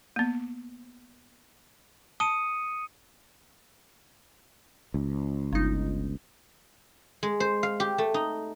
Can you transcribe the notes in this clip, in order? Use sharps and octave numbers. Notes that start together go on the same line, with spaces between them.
A#3 B3
A5 D#6 C#7 D#7
C#2
G1 D#4
G#3
C5
F5
G4
A3
D#4